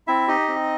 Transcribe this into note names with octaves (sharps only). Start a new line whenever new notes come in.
C4 E4 E5
D#4 G4 D#5
C4